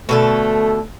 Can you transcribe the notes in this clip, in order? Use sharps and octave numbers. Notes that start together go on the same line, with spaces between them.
B2 D3 A3 A4